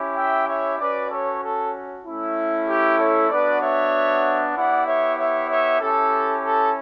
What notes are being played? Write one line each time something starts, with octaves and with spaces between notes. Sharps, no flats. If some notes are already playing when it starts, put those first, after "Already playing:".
Already playing: C#4 E4 G4
E5 G5
C#5 E5
C#4 F#4 B4 D5
A4 C#5
A4
A3 C#4 E4
G4
A4 C#5
B3 D4 F#4 B4 D5
C#5 E5
B3 E4 G4 D5 F#5
C#5 E5
C#5 E5
C#5 E5
C#4 E4 G4 A4
A4